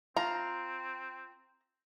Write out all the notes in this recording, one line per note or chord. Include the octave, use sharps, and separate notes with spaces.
C4 F4 A#5